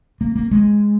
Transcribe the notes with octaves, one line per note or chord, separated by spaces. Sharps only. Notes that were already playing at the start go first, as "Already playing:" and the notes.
A#3
A#3
G#3